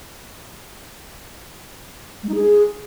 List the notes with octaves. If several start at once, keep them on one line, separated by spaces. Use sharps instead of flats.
G#3
D#4
G#4